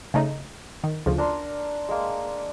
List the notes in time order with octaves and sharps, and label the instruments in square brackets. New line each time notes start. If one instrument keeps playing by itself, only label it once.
[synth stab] C#3 A3 D#4
D#3
D2 C#3 F3
[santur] D4 A#4 C6
G#3 A#3